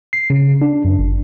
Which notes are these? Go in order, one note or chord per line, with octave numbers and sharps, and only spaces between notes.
C7
C#3
D4
F#2
G1